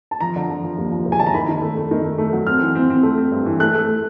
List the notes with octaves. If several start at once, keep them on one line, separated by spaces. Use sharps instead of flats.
A5
F3 A#5
D3
F3
F3
D#2
F3
E1
G#5
D3 A5
A#5
D#3 B5
D#3
A3
A3
D#3
A3
A3
F#3
C4 F6
E3
C4
C4
A3
C4
G2
E3
A3 F#6
A3